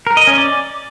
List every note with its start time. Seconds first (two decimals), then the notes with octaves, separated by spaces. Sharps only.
0.07 A#4
0.17 D#5
0.27 C#4
0.38 D5